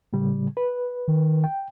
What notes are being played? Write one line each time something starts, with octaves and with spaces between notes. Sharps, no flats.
A2 C#3 G3
B4
D#3
G5